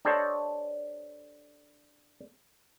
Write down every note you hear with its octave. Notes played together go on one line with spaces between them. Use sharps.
D4 G4 A4 C5 C#5 D#5